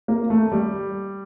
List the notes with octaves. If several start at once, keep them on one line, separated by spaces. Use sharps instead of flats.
A#3
A3
G3